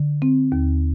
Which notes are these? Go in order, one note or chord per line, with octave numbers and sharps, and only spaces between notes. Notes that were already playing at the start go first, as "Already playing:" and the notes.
Already playing: D3
C4
D#2